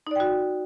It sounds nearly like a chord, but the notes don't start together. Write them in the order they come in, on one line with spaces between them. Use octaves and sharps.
D#4 D5 G5 F#4